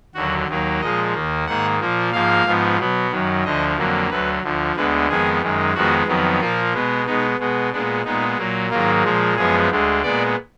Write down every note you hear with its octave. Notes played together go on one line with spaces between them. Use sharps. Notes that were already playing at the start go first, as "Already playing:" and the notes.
D#2 D3 F#3 F#4
D#2 D#3 F#3 A#3
A#2 F3 G#3 D#5
D#2 D#3 A#3
G#2 D#3 A#3 F#5
A#2 F3 A#3
G#2 F3 A#3 F5
G#2 F3 B3
B2 F#3 B3
F#2 D#3 F#3
D2 D3 F3 D#5
F2 D3 F#3 A#3
D2 D3 F#3 B4
D2 D3 F3
D2 D3 G#3 B3 B4
F2 D#3 G#3 B3 G#4
F#2 D#3 G#3
F2 D#3 G#3 B3 F#4
F2 D#3 F#3 B3
A#2 F3 A#3 F4
B2 G#3 B3
B2 G#3 B3 D#4
B2 G#3 B3
A#2 G#3 B3 D4
A#2 G#3 B3 D#4
A#2 F#3 A#3
G#2 D#3 F#3 A#3 F4
A#2 F3 G#3
F#2 F3 G#3 B3 G#4
D2 D3 G#3
A#2 G#3 B3 D5